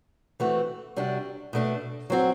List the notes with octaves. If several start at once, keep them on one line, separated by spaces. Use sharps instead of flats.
E3 A3 C4 F#4
C3 G3 D4 F#4
B2 A3 D4
F#3 C4 F#4